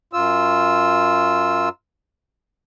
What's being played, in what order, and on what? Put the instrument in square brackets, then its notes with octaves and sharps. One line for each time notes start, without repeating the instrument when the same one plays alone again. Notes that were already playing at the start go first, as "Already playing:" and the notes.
[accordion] F#2 F4 E6